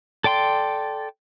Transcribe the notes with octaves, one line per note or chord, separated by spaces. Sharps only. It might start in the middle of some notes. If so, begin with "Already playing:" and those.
A4 D5 G5 C6